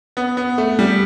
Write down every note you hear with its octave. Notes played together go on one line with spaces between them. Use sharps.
B3
B3
A3
G3